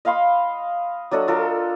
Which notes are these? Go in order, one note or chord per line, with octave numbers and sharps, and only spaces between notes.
D#5 F5 B5 C6
F#3 D4 A4 D#5
F4 A4 A#4